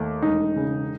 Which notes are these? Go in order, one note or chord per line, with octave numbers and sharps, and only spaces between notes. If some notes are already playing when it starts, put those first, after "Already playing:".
Already playing: D#2 A3
E1 D#4
C#3